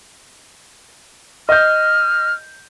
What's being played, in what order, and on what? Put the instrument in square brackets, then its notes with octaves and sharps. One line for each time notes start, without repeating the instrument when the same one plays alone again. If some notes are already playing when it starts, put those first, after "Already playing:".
[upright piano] D#5 G6 [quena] F6